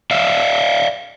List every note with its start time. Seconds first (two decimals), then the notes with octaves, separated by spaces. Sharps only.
0.11 D5 E5 F5